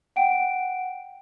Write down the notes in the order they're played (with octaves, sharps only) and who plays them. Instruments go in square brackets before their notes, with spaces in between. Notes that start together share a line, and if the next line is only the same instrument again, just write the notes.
[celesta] F#5 G5 D7